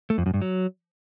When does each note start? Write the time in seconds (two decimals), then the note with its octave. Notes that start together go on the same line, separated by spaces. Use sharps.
0.10 A3
0.18 F2
0.26 F#2
0.34 G2
0.42 F#3